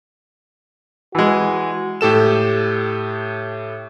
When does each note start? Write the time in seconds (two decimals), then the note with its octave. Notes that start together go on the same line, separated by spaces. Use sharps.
1.15 E3 G#3 F#4
2.01 A2 G4 A4 E7